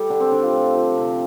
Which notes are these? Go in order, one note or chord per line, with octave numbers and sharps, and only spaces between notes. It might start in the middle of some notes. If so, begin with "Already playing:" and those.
Already playing: G3 A3 G4 A4
D3 D4
C4
D3 D4
F4
A3
F3
C3